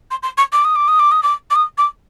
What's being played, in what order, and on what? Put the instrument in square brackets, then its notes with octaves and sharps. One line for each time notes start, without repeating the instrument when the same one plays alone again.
[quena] C6
C6
C#6
D6
D#6
D6
D#6
D6
D#6
D6
D6
D#6
D6